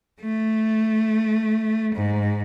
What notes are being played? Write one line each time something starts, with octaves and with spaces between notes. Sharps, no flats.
A3
G#2